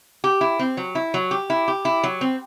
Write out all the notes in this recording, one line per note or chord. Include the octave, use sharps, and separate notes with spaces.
G4
E4
C4
F#3
E4
F#3
G4
E4
G4
E4
F#3
C4